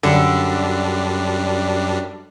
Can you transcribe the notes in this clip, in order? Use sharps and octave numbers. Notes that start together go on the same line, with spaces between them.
F#2 D3 G3 D4